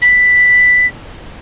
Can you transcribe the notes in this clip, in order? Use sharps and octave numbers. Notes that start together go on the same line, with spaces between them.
B6